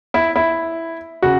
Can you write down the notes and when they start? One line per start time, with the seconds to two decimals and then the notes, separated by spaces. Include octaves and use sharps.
0.14 E4
0.36 E4
1.22 C#3 F#4